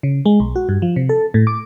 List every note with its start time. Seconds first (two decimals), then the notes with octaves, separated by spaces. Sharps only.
0.03 C#3
0.26 G#3
0.40 B1
0.56 F#4
0.69 G2
0.82 F3
0.96 C3
1.09 A4
1.34 A2
1.47 D6